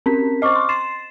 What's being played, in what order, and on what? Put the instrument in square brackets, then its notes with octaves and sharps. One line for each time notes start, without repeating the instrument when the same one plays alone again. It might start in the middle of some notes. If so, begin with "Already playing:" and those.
[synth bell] C4 C#4 [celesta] A#4 B6
[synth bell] C5 D#5 [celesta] C#6 D6 F6
[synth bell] C6
[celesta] C6 [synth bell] A6 C7 E7